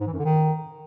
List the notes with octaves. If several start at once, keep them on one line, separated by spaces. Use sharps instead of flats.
G#2
E3
F#2
D3
D#3